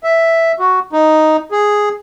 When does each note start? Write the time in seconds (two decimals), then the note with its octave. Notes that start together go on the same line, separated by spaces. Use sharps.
0.04 E5
0.59 F#4
0.93 D#4
1.51 G#4